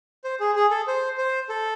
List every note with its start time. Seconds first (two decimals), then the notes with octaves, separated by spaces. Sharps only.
0.24 C5
0.40 G#4
0.56 G#4
0.71 A4
0.87 C5
1.18 C5
1.49 A4